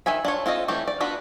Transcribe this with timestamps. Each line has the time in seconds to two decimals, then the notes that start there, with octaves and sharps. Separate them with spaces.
0.06 D#3 E5 G#5 B5
0.25 D4 F4 C#5
0.46 C4 F4 A4 D#5
0.68 E3 A3 C#4 G4
0.88 D5
1.00 B3 D4 F4 F#4 B5